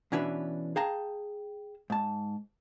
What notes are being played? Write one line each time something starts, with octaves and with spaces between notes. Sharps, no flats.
B2 E3 C#4 D4 B4 E5
G#4 F5 G5 A5 A#5
G#2 A5